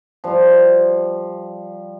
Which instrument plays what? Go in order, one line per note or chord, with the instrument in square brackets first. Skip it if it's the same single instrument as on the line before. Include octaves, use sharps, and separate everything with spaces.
[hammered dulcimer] F3 G3